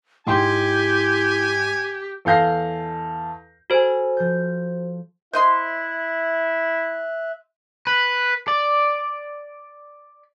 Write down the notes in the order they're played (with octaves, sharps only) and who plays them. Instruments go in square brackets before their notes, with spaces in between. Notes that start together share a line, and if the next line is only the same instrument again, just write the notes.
[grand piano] G#2 G5 C6 [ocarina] E4 [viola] G4 [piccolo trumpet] G#5
[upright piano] E2 A4 F5 G6 A#6 C7
[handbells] F#4 C5 [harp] A4 G#5
[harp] F3 G6
[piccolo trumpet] E4 [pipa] C5 D#5 C6 [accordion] E5 F#6
[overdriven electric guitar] B4
D5